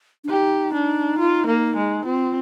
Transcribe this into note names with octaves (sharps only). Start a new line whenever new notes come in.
D4
D#4 G4
D4
F4
A#3
G#3
C4 F4